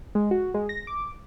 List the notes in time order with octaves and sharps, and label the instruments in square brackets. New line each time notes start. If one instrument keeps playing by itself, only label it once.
[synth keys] G#3
F#4
G#3
A#6
D6